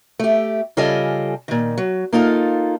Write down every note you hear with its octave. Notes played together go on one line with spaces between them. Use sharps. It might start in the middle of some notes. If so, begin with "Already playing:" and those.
A3 G4
C#3 G3 F4 A4 D#5 G#5
A#2 D#3
F#3
A#3 D#4 F4 A4